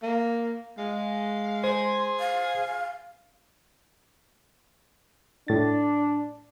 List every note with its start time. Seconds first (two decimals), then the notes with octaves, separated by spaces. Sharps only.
0.03 A#3
0.78 G#3 F5
1.64 G#4 C5 C6
2.20 F5
5.48 A2 D4 A6